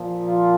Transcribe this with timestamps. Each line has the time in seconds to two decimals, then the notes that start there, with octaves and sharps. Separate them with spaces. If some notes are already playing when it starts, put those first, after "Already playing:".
Already playing: A#2 F3
0.27 F4